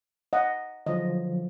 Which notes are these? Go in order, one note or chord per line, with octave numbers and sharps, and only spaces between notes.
D#5 F#5
D3 F3 F#3 D#5